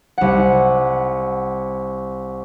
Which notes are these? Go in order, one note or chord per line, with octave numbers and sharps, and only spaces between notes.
C2 F#5